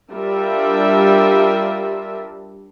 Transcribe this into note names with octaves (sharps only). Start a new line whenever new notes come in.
G3 D4 F4 A#4 E5